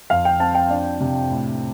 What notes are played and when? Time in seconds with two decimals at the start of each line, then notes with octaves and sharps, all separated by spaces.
0.10 F2 F5
0.25 G5
0.40 C4 A5
0.55 G5
0.70 D4
1.00 C3
1.30 A2